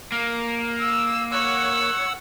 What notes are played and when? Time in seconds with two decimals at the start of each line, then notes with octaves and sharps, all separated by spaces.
0.12 A#3
0.80 E6
1.32 C#5 F#5 E6